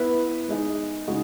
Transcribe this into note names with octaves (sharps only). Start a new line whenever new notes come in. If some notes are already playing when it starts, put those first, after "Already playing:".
Already playing: B3 E4 B4 E5
G#3 D#4 G#4 D#5
C#3 G#3 D#4 F#4